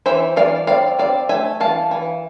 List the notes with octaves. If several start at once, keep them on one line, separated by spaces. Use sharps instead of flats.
E3 C5 E5
E3 D5 F5
C4 D5 F5
C4 D5 F5
A3 E5 G#5
E3 F5 A5
E3